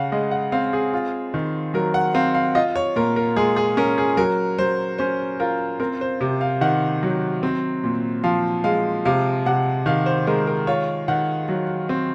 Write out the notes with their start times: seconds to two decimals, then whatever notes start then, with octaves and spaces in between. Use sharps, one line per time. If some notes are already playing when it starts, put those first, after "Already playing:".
Already playing: C#3 F5 F#5
0.12 G#3 D#5
0.31 F#5
0.52 C4 F5
0.73 G#4
0.93 F4
1.34 D#3
1.74 F#3 A#4
1.94 F#5
2.14 C4 F5
2.34 F5
2.55 F4 D#5
2.75 C#5
2.96 A#2 A#4
3.16 A#4
3.36 G#3 G#4
3.56 G#4
3.77 C#4 A#4
3.98 G#4
4.17 F#3 A#4
4.58 F#3 C5
4.98 C#4 C5
5.40 F4 A#4
5.80 C4 A#4
6.01 C5
6.21 C3
6.41 F5
6.61 D#3 F#5
7.03 F#3
7.43 C4
7.84 A#2
8.24 F3 F5
8.64 G#3 F5
9.05 C3 F5
9.46 C3 F#5
9.86 D#3 F5
10.06 C5
10.27 G#3 A#4
10.47 A#4
10.67 F4 C#5
11.08 D#3 F#5
11.49 F#3
11.89 C4